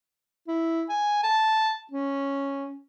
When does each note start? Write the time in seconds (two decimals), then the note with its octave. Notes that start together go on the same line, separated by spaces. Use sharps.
0.48 E4
0.89 G#5
1.23 A5
1.91 C#4